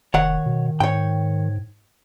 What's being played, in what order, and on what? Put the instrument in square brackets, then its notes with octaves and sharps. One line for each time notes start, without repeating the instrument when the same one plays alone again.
[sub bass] F1 [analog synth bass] D#3 [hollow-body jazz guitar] C#5 F#5
[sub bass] B2
[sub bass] G#2 [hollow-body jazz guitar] C#5 G5